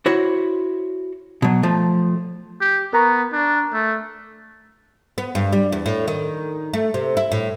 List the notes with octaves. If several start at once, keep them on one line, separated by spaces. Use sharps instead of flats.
E4 F#4 C5 C#5
B2 F#3
F3 A3
G4
B3 A#4 A#5 C#6
D4
A3
B3
G2
G3
E2
A2
D#3
A3
C3
E4
A2